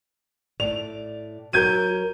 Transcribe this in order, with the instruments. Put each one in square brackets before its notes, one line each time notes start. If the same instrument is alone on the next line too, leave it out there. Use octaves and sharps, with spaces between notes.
[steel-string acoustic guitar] A2 D5 [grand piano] F7
[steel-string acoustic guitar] F#3 A#4 [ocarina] F#4 [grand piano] G6 G#6 D#7